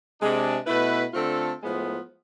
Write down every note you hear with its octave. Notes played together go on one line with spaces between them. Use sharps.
C3 G#3 D4
B2 A3 E4 B4
D3 A3 C4 F4 A4
A2 F3 G#3 B3